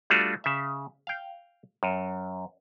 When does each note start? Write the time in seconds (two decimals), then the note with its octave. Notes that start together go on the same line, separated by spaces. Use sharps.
0.10 G3 A3 D4 F4 F#4
0.44 C#3 E5
1.07 F5 G5
1.83 F#2